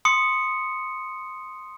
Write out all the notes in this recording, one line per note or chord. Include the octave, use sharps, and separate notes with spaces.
C6 D#6 C#7